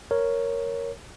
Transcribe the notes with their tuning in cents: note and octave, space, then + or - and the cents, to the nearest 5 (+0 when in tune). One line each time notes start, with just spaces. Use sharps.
A#4 +0 C#5 +0